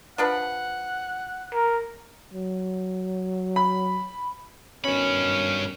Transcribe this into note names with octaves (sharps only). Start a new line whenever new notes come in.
F3 D4 B4 F#5
A#4
F#3
B5
G2 B2 D#3 C#4 B5